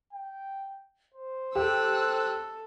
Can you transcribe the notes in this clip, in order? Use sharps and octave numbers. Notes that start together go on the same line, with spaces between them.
G5
C5
G4 A4 E6 F#6